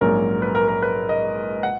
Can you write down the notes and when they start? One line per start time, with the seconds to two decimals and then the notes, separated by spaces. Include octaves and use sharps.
0.01 A#1 G#2 F#3 C#4 A#4
0.42 B4
0.55 A#4
0.68 A#4
0.82 B4
1.09 D#5
1.63 F#5